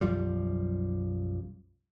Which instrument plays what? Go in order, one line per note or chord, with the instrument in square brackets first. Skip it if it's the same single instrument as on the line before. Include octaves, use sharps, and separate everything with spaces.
[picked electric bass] B1 F#2 F3 G3